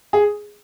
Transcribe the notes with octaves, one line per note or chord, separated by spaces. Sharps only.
G#4